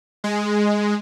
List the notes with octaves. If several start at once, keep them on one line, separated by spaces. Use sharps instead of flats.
G#3